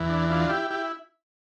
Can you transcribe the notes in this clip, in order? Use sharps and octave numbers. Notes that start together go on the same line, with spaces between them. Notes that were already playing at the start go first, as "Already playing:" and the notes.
Already playing: E2 E3
D4
D4 F4
E4 G4
E4 G4